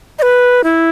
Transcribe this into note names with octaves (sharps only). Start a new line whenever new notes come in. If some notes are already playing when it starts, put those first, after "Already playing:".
D#5
B4
E4